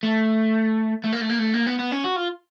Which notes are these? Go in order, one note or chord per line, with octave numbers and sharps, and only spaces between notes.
A3
A3
A#3
A3
A#3
A3
A#3
B3
B3
C#4
F#4
F4